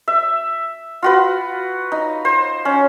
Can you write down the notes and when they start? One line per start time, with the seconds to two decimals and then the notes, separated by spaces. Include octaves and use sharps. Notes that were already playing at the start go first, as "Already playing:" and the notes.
0.08 E5
1.02 F4 F#4 B4
1.92 D#4
2.25 C5
2.65 C#4